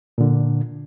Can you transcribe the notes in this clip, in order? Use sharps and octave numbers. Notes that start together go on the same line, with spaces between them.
A#2 D3